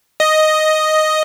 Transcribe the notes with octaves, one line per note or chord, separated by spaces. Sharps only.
D#5